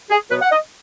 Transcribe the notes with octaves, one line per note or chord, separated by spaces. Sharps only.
G#4
B2 F#3 B3 B4
F#5
D#5